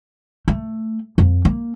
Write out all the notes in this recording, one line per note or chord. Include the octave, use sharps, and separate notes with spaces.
A3
F2
A#3